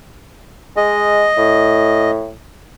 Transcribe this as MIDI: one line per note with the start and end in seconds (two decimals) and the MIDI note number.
0.77 1.29 56
0.77 2.11 75
1.38 2.32 45